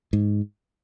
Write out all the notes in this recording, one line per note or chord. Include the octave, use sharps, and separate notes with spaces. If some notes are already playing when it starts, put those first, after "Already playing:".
G#2